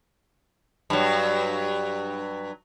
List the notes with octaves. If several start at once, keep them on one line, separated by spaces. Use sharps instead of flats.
G2 F#3